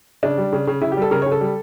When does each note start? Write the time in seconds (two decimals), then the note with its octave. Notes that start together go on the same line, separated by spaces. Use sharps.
0.23 C#3 D4
0.38 G3
0.53 C#3
0.67 C#3
0.81 C#3 E4
0.92 G4
0.97 G3 A4
1.11 C#3 A#4
1.22 C#5
1.26 C#3
1.32 A4
1.41 G3